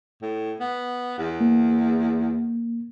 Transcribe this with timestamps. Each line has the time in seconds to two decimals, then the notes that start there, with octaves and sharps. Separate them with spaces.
0.22 A2
0.60 B3
1.18 E2
1.41 A#3